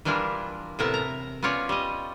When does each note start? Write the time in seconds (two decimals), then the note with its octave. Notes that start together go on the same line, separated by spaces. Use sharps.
0.05 E3 G3 D4 E4 F4 A#4
0.79 A2 C3 B3 A#4 E5 A5
0.94 A#5
1.43 B3 C#4 F4 C#5 D5
1.69 G3 D#5